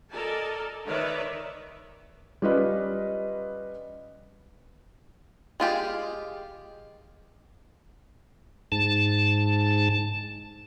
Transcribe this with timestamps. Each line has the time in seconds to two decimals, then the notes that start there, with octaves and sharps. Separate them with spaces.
0.11 A4 A#4 D5 D#5 G#5 A5
0.86 D#3 A#4 B4 C#5 D5 E5
2.42 G3 C#4 F4 B4 D#5
5.60 G#3 F4 G4 G#4
8.72 G#2 A5